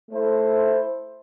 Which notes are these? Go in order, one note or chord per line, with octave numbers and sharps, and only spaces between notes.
A3 E4 A4 C5